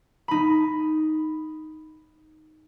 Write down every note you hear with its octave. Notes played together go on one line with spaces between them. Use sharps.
D#4 B5